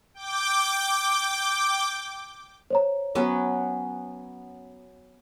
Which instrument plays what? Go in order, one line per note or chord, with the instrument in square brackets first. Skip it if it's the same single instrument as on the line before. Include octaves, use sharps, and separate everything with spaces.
[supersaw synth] G5 D6
[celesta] C5 C#5 A#5
[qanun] F#3 B3 C#4